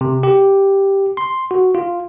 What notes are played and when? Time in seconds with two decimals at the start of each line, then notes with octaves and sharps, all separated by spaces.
0.01 C3
0.23 G4
1.17 C6
1.51 F#4
1.75 F4